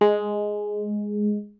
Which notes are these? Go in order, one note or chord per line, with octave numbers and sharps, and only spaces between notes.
G#3